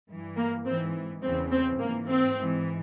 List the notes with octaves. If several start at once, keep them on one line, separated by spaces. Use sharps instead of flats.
G2 E3
A#3
G#2 E3 C4
E2 C#3 E3 C4
C4
G#2 E3 A#3
C4
G#2 E3